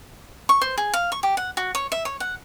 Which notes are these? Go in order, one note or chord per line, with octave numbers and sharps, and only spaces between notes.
C#6
C5
G#4
F5
C#6
G4
F#5
F#4
C#5
E5
C#5
F#5